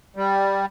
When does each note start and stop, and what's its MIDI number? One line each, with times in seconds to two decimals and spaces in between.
0.16 0.66 55